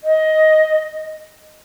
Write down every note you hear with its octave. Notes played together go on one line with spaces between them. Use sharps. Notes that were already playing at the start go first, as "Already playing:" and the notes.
D#5